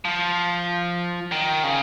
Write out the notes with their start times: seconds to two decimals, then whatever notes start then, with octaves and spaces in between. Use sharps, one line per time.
0.05 F3
1.32 D#3
1.64 C#3